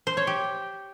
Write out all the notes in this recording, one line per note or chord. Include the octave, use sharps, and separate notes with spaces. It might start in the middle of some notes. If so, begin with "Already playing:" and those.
C5
C#5
G4